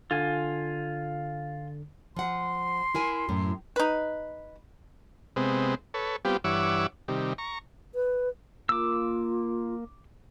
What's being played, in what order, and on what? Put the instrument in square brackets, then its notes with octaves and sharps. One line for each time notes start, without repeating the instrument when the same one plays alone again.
[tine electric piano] D3 [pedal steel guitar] F4 G#5
[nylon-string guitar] F3 F#5 [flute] C6
[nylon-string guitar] E4 A#4 G#5
F#2 A2
[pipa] D#4 B4
[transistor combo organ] C3 G#3 B3 C4
A4 B4 C#5
G3 B3 C4 F4 G4
G2 E3 C#5 F#5 D6 E6
C3 D#3 G3
A#5 C#6
[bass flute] B4
[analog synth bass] A#3 [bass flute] F4 [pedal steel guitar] D6 E6